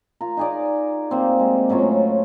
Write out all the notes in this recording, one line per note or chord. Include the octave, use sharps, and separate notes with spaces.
F4 A#4
D#4 G#4 D5
C3 A#3 C4
G#3
A2 F#3 C#4 F4